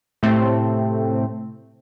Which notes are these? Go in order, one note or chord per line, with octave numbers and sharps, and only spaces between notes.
A2 C3 A3 C4